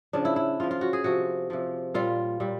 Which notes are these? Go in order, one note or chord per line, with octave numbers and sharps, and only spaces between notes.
C#3 F3 D4
E4
E4
C#3 F3 F4
F4
F#4
G#4
C3 F3 F#4
C3 F3
A#2 G3 F4
A#2 G3